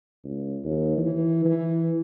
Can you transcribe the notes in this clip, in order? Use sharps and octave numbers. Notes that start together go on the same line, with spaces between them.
C#2
D#2
E3
E3